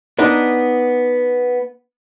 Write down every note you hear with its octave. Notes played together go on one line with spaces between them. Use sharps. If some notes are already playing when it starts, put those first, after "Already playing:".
B3 D4 D#4